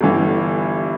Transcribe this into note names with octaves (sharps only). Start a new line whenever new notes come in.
G1 G2 E3